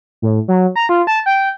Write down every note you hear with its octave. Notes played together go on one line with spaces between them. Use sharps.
A2
F#3
A#5
F4
A5
G5